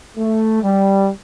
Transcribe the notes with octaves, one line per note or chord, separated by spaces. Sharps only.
A3
G3